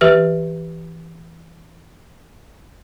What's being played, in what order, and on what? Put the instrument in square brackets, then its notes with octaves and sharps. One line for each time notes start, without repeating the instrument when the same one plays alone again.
[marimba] E3 G4 B4 E5 F6